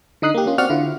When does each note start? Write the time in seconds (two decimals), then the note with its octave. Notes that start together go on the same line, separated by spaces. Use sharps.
0.22 D3 D#4 D#6 F#6 C7
0.34 A#3 G4
0.46 A#3 C#4 F4
0.58 C4 F#4 D5 F#5 F6
0.70 D3 E4 F4